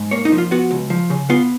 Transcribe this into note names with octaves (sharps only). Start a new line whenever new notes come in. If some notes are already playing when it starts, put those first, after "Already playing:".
Already playing: G#2
A#3 C#5
D#4
F3
F4
B3 F#4
C#2
F3
C#3
B3 F4